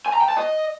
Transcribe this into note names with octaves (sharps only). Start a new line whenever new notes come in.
G#5
A#5
G5
A5
D#5